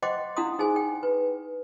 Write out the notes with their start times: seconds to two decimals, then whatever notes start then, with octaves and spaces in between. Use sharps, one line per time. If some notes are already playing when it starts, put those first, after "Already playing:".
0.02 C5 D#5 F#5 G5 C6 D6
0.36 D4 E4 F5 F#5 C6 D#6
0.59 D#4 G#4 C5 G#5
0.76 G5
1.03 B4